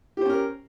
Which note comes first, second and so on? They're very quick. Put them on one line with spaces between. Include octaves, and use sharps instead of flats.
G4 C5 C#4 A#4